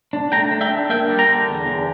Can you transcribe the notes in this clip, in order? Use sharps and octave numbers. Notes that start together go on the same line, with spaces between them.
D4
A3 G5 A#5
D4
E5 G5
D4
A#3 E5 G5
G3
G5 A#5
D3
E2
E2